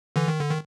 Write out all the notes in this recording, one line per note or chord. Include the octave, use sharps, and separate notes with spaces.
D3 E3
D#3
D3
D#3